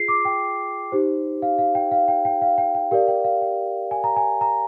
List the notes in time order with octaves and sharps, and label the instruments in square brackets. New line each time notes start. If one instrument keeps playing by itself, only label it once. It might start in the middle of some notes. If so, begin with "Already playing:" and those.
Already playing: [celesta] F4 G#4 C7
D6
G5
D#4 G4 C5
F5
F5
G5
F5
G5
G5
F5
G5
G5
G4 A#4 D5 F5
G5
F5
G5
G#5
A#5
G#5
A#5